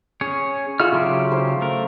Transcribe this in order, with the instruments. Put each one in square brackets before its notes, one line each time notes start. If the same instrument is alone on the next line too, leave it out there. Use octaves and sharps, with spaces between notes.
[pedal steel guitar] C#4 G#4 C#5
[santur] F4 G#4 E5 [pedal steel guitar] F#4 F6
[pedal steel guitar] C#3 F#3 G4 [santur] G#4 C6
[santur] C5
[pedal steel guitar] A3 A#4